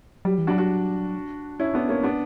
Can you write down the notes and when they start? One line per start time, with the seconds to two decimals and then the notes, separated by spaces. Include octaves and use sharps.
0.25 F#3 G3
0.38 E3
0.47 D4 F#4
0.51 F#3
0.58 D4 F#4
1.59 C#4 E4
1.74 B3 D4
1.89 A#3 C#4
2.03 B3 D4